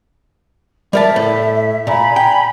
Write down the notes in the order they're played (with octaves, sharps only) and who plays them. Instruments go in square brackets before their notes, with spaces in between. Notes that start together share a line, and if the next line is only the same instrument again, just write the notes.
[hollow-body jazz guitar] G3 A#4 A5 [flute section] E5
[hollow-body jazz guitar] A2
[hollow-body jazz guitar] A#2 [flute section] G#5 A#5 B5
[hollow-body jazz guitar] G5